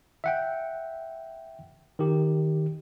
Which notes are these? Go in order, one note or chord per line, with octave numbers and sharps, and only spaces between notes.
E5 F#5 G5
D#3 G4